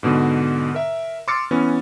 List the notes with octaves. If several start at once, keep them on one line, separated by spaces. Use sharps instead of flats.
G#2 B2 D3
A#4 E5
C6 D6 E6 F6 A6 C#7
E3 B3 C#4